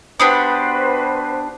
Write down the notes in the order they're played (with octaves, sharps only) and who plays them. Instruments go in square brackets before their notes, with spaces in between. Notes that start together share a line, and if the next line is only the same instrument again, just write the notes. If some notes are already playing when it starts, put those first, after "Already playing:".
[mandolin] B3 D4 G4 [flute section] F#4 B4 C5